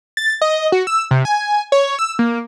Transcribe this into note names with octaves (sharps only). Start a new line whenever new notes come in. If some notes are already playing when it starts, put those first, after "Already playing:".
A6
D#5
F#4
E6
C3
G#5
C#5
E6
A#3